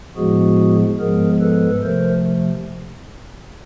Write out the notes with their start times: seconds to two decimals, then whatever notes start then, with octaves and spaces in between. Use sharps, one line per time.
0.16 A2 F3 G#3 B3 F#4 G#4
0.99 G#2 F3 G#3 B3 G#4 A#4
1.41 A4 B4
1.83 C3 F3 A3 A#4 C5